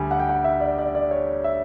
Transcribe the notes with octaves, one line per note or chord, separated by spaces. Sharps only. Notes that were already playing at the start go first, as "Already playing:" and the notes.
Already playing: D2 D3 G3 G#5
F#5
G5
F#5
E5
D5
D5
D5
C#5
E5